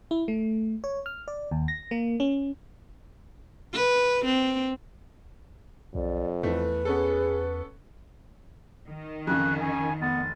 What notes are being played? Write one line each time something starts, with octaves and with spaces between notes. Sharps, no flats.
E4
A3
C#5
F6
D5
D#2
A#6
A#3
C#4
B4
C4
B1 F2 D5
E2 E3 A3 B4
B3 C#4 G#4 A4
D#3
F2 C#3 F3 C#4 F#6
C#4 G#5
F1 B3 A6